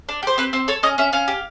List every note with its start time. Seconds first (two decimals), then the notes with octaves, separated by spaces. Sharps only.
0.09 D4
0.23 G4 C5
0.38 C4 B4
0.53 C4 C5
0.68 A4 C#5
0.83 C#4 D#5
0.98 C#4 E5
1.13 C#4 F5
1.28 G4